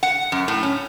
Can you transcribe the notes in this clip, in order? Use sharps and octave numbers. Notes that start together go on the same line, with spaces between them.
F#5
F#2
A2
C#4